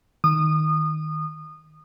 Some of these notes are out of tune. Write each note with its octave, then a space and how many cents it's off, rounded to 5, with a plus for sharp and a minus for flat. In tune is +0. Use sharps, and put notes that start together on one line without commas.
D#3 +0 D#6 -25